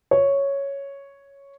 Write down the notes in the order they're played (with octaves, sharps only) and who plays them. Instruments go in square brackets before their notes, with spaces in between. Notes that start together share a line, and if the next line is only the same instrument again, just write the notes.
[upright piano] C#5